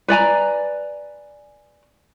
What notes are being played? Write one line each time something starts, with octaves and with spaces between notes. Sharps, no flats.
B4 D5 G#5 A#5